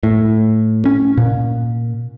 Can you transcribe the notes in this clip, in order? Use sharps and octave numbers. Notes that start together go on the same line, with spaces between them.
A2
C#4
A#2